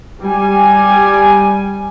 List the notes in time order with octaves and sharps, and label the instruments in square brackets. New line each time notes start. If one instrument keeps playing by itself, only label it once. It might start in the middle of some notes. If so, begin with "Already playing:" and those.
[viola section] G3 G#5